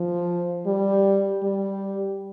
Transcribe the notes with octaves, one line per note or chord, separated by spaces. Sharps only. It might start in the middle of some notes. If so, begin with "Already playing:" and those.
Already playing: F3
G3
G3